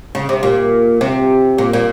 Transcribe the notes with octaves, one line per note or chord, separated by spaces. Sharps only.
C#3
C3
A#2
C3
A#2
A#2